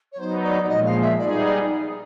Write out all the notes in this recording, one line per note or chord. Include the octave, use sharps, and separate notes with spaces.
C#5
F#3 B3 D#4 C5
D5
D5
A#2 F3 G#3 D#5
F5
E5
G3 B3 D#4 G#4 D5